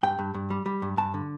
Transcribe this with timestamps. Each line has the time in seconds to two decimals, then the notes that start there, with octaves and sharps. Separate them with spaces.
0.03 G2 G5
0.19 G2
0.34 G2
0.50 G3
0.66 G3
0.82 G2
0.97 G2 A5
1.14 D3